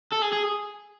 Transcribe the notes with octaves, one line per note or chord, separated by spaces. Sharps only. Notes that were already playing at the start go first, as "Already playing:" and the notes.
A4
G#4
G#4